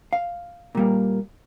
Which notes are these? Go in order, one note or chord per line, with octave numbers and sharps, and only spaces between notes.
F5
A#2 G3 A#3